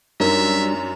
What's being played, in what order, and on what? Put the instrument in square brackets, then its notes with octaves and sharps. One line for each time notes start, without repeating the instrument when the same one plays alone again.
[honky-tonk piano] F#2 [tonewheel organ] G3 D4 [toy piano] D#4 A#4 D5 [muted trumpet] E5